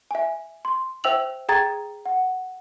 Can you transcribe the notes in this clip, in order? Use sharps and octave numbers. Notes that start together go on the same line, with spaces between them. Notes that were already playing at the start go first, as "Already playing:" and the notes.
E5 G#5
C6
C5 E5 G5 E6 F7 F#7
G#4 G5 A#5 G#6 A6
F#5